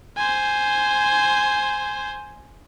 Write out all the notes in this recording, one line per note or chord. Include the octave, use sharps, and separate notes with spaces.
C5 G#5